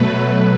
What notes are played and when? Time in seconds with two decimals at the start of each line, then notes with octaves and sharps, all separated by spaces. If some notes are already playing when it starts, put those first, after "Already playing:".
Already playing: B2 F#3 A3 B4